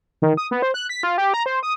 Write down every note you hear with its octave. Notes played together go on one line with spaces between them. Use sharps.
D#3
D#6
B3
C5
F#6
B6
F4
G4
A#5
C5
D#6